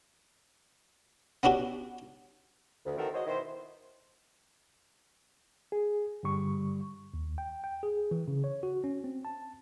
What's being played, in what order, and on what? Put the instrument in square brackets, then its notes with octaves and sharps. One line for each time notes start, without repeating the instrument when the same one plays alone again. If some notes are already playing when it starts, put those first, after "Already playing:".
[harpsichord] B3 C#4 D4 F#4 G4
[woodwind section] D2
D#3 E3 C4 F#4 A4 A#4
G#3 F#4 C5 C#5 D#5
B2 D#3 E4 C5
[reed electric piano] G#4
G2 D3 G3 C#6
[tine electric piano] D#2
G5
G5
G#4
E3
C#3
C#5
F#4
C#4
C4
A5